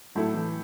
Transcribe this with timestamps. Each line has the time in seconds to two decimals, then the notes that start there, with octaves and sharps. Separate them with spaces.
0.15 A2 F#3 A3 E4 A4
0.34 E3